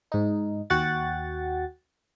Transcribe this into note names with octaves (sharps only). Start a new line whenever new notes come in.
G#2 D#4
D#2 F#4 F#5 G5 A6